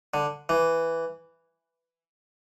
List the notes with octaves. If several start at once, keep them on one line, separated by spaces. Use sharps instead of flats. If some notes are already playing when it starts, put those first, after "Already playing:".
D3
E3